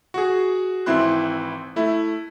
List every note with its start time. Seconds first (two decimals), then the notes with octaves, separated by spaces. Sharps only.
0.14 F#4 G#4
0.86 G#1 E3 C4 E4 C6 F#6
1.76 A3 E4